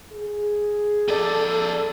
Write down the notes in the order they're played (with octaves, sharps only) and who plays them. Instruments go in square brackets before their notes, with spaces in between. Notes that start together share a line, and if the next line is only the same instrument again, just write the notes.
[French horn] G#4
[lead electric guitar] F2 D5 [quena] A4